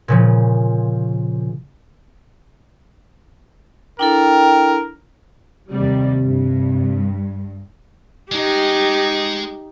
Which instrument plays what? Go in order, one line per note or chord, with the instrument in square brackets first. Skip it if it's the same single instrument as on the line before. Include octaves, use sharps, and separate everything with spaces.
[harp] A#2 C#3 F3
[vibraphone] D4 E4 A4 [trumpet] A#4 [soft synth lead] G5
[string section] D#2 G3 [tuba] C3
[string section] G2
[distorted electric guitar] G#3 [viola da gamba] D#4 G4